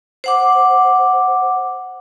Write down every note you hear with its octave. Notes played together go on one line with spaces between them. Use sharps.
C5 F#5 D6